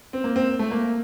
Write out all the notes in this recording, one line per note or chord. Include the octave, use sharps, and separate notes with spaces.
C4
A#3
C4
A3
A#3